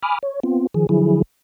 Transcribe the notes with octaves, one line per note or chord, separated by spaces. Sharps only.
G#5 B5 D6 D#6 F6
C#5
B3 C4 F4
D#3 F3 G#4
D3 F3 F#3 E4 G#4